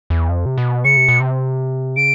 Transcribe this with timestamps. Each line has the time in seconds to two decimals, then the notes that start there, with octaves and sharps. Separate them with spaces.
0.10 E2
0.29 F2
0.46 C3
0.58 B2
0.85 C#3 C#7
0.97 C3
1.09 B2
1.20 C3
1.97 C#3 D7